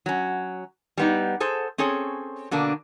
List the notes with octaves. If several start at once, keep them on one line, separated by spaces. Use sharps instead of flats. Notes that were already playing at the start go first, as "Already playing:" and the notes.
F#3 C#4
G3 B3 D#4
G#4 A4 C5
C4 C#4 G#4 A4 C#5
B2 D3 A#3 D4